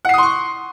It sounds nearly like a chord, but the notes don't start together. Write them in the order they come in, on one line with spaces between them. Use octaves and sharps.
F#5 C7 D#6 C6 C#6